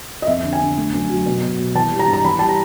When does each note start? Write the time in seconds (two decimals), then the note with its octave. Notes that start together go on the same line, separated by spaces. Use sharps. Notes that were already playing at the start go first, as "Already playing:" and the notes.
0.22 D#5
0.27 F2 E5
0.44 D3
0.53 G#5
0.61 D3
0.77 A3
0.93 F#2
1.10 F#3
1.26 B2
1.43 B2
1.59 B2
1.75 E3 A5
1.91 G3
1.99 A#5
2.08 G2
2.13 A#5
2.24 E3 B5
2.39 G3 A5
2.49 A#5